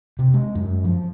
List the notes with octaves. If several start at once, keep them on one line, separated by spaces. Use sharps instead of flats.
C3
G#3
F#2
F3